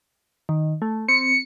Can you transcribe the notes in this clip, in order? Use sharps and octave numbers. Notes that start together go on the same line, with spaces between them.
D#3
A3
C4 C#7